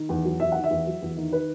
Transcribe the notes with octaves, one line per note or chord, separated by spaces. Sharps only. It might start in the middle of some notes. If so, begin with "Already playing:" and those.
Already playing: D#3
E2
F#3
E2 E5
D#3 F#5
E5
E2
F#3
E2
D#3
B4